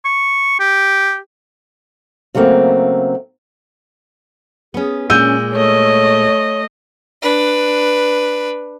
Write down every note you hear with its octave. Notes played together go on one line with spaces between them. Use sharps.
C#6
G4
C#3 F#3 A3 A#3 C4
B3 C#4 G#4
A#2 G#3 C#4 E6 G6 D#7
A3 C#5 D#5
D4 B4